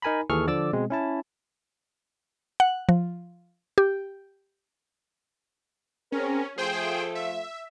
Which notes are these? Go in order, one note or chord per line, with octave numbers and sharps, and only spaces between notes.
D#4 A#4 G#5 A#5 B5
D#2 E3 G#4 A4 C#6 F6
D3 F3 D5 D6 E6 A6
B2 G#3 C4
C#4 E4 A5
F#5
F3
G4
C4 C#4 G#4 A#4
F3 A3 F4 G#4 C5 G5
E5